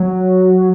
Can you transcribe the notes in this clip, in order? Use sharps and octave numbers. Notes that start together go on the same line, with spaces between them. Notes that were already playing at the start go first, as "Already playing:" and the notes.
Already playing: F#3